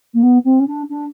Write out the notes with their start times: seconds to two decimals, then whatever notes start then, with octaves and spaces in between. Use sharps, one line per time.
0.14 A#3
0.23 B3
0.44 C4
0.60 C#4
0.67 D4
0.90 D4